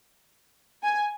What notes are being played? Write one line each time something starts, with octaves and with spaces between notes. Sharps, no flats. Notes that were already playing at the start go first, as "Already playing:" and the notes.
G#5